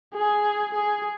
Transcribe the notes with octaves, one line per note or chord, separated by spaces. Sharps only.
G#4
G#4